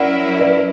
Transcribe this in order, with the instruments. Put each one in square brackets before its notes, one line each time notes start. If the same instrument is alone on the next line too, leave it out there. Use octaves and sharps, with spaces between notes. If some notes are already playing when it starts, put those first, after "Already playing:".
Already playing: [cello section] F#3 C#4 E4 A#4 [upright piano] D5 F#5
[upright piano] B4 D5